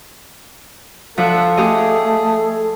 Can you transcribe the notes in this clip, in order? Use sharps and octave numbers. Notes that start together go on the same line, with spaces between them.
F3 D4 A4 E5 F#5
A3 G4 G#4 D#5